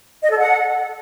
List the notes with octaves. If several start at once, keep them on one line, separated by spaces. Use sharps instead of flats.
D#5
A4
F#5